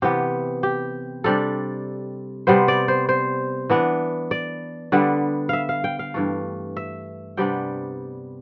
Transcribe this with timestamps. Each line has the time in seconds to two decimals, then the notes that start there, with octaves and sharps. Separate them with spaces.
0.02 C3 E3 B3 G4
0.63 G4
1.24 C3 G3 D4 A4
2.47 C3 G3 B3 C5
2.68 D5
2.88 C5
3.09 C5
3.70 E3 B3 D4
4.31 D5
4.92 D3 G3 B3 D4
5.49 E5 F5
5.69 F5
5.84 G5
5.99 F5
6.14 G2 E3 A3
6.77 E5
7.37 C3 G3 B3 D4 G5